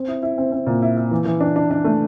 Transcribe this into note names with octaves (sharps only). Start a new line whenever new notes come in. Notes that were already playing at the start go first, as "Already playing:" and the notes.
Already playing: C4
E4
E4
C4
C4
A#2
E4
E4
E3
E3
D4
D4
D4
A3